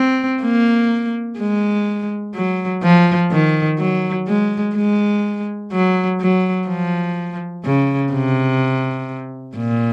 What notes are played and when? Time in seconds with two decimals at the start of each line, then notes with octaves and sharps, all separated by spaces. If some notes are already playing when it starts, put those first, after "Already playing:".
Already playing: C4
0.42 A#3
1.39 G#3
2.35 F#3
2.83 F3
3.31 D#3
3.79 F#3
4.28 G#3
4.76 G#3
5.72 F#3
6.20 F#3
6.68 F3
7.65 C#3
8.13 C3
9.57 A#2